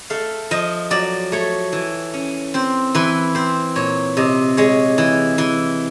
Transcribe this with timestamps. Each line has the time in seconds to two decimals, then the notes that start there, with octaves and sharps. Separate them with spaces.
0.10 A3 F5
0.51 F3 D#5
0.91 F#3 D5
1.32 A3 C#5
1.73 E3
2.14 C#4
2.54 C4 C5
2.95 E3 B4
3.35 C4 C5
3.76 A#2 C#5
4.17 C3 D#5
4.57 G#3 C#5
4.98 E3
5.38 E3